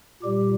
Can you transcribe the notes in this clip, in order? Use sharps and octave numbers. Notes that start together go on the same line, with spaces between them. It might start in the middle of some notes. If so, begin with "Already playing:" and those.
A#2 G3 G4